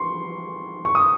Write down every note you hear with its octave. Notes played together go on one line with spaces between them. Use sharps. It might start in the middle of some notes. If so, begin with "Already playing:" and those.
Already playing: C6 C#6
C#6
D#6